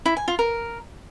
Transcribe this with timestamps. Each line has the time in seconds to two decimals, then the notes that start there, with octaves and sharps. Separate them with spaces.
0.06 E4
0.17 G#5
0.28 F4
0.39 A#4